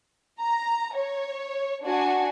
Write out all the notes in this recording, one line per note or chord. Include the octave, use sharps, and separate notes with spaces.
A#5
C#5
D4 F#4 G#5